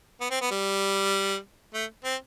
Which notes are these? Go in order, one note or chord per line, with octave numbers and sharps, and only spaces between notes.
B3
C4
B3
G3
A3
C4